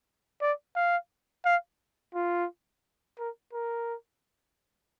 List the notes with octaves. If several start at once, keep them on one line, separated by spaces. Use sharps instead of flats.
D5
F5
F5
F4
A#4
A#4